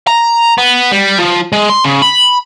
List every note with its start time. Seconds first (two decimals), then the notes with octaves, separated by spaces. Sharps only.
0.07 A#5
0.58 B3
0.92 G3
1.19 F3
1.52 G#3
1.69 C6
1.84 C#3
2.02 B5